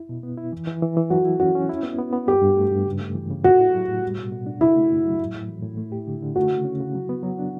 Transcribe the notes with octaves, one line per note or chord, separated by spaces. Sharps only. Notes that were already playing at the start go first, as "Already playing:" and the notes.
Already playing: E4
B2
B3
E4
E3
E3
E3
E3
F#3 F#4
E4
C#4 F#4
C#4
E4
B3
B3
B3
G2 G4
G2
A3
G2
C#3
A3
E3
C#3
A2 F#4
E4
F#3
A2
G3
B2
B2
D4
C#3 E4
A3
F#2
F#3
A2
A2
E3
A2
A3
G4
D3
D3
A3 F#4
C#3
C#4
C#3
F#3
B3
F#3
D4